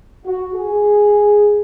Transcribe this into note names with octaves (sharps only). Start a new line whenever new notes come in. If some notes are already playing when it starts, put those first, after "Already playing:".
F#4
G#4